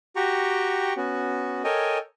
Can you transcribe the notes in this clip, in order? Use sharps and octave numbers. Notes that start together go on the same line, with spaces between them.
F#4 G4 G5 A#5 C#6
B3 C#4 F#4
A4 A#4 C#5 D#5 G5 G#5